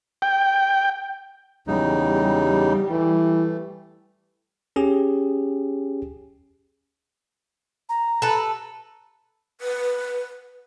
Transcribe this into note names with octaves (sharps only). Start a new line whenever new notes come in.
G5
E2 C#3 G3 D#4
G4
E3 A3
C#4 G4 G#4
A#5
A4 B4
B4